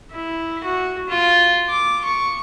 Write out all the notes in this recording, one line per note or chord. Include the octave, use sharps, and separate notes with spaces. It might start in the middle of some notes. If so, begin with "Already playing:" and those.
E4
F#4
F4
D6
C#6